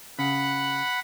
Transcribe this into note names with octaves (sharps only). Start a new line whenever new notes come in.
C#3 F#5 B5